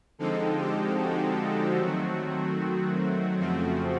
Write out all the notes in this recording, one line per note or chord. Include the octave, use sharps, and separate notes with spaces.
D3 F3 G#3 C4 D#4 A4
G4
F#4
D#3 F#3 A3 C4
F2 C#3 F3 A3 C4